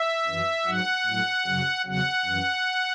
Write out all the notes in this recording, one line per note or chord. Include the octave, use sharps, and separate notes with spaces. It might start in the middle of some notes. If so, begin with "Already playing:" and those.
Already playing: E5
F#2 E3
G#2 F#3 F#5
A2 F#3
F#2 C#3 F#3
E2 C#3 F#3 F#5
F#2 E3